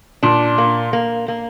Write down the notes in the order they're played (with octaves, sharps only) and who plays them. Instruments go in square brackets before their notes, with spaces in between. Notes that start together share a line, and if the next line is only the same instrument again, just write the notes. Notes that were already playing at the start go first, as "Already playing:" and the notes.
[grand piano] A#2 [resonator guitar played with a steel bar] D4
[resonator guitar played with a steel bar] A#3
A#3
A#3